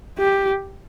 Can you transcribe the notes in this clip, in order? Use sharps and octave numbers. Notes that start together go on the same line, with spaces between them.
G4